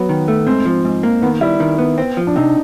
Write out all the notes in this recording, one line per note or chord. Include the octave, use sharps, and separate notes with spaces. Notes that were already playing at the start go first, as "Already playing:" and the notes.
Already playing: F#3 B3
D#3
A3
G#2 C4
F3
G#2
A#3
D#3 B3
G3 E4
D#3
B3
C4
F3
D4
C3 D#4